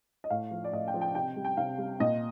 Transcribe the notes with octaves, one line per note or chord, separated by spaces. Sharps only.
D#5
A2 F5
F3
D5
A2 D#5
G5
F3
G5
C3 G5
G3
G5
C3 F5
G3
A#2 D#5